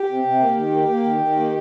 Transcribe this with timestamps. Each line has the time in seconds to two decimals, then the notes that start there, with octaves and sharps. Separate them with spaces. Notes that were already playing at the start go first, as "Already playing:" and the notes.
Already playing: G4
0.09 C3
0.24 C3
0.40 A#3
0.56 D#3
0.72 A#3
0.89 A#3
1.04 D#3
1.21 D#3
1.36 A#3